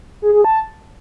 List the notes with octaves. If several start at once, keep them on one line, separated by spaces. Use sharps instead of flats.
G#4
G#4
A5